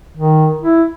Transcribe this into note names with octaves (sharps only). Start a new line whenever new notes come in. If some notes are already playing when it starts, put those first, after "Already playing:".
D#3
E4